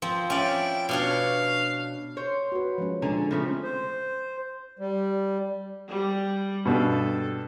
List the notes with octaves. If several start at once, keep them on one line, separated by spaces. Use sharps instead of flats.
F3 C4
C#4 E4 D5 G5
B2 D4 C#5 F5
C5 C#5
F#4 B4
F3 G#3 C#4
A#2 D3 F3 G#3 G#5 A#5
C#3 F3 A3 C4
C5
G3
G3
G2 B2 A4